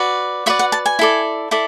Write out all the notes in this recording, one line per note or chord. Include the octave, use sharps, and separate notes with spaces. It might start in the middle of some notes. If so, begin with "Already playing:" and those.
Already playing: F#4 B4 D5
F#4 B4 D5 E5
F#5
A5
G#5
E4 A4 D5
E4 A4 D5